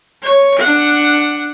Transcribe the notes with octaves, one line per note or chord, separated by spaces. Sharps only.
C#5
D4 F#5